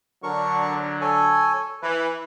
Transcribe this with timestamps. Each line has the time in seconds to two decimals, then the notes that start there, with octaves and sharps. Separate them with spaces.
0.23 D3 F#3 D4 A#4 C#6
1.01 A4 C#5 G#5
1.82 E3 B4